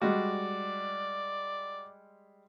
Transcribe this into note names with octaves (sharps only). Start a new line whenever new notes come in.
G3 G#3 F#4 D5